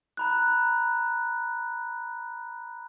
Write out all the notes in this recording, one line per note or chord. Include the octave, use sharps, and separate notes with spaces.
A#5 B5 F#6